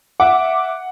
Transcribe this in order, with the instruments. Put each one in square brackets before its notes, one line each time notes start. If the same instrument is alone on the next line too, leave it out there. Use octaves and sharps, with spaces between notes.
[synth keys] E5 D6 [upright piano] F#5